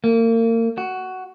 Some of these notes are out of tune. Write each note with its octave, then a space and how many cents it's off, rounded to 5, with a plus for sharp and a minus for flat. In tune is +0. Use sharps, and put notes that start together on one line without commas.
A#3 -35
F#4 +10